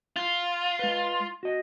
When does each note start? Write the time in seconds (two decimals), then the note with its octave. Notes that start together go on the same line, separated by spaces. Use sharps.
0.16 F4
0.79 G#3 B4
1.43 F#4 D#5